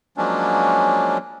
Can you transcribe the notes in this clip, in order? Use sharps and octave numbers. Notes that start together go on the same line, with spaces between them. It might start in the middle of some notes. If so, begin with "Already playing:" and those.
F3 F#3 G#3 A#3 C#4 D4